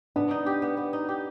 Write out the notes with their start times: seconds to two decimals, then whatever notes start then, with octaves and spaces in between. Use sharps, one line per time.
0.16 B3 D4
0.31 D#4
0.46 G4
0.62 B3
0.77 B3
0.93 D#4
1.09 G4